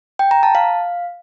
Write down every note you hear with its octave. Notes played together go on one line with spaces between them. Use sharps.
G5
A#5
A5
F5